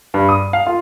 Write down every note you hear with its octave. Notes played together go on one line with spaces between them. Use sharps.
G2
D#6
F5
F4